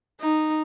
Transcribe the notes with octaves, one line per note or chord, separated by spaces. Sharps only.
D#4